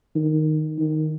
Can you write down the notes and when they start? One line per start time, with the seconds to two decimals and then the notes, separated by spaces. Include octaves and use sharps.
0.15 D#3
0.78 D#3